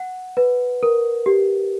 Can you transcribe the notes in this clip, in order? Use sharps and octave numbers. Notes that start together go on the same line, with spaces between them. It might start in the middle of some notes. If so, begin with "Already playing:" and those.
Already playing: F#5
B4
A#4
G4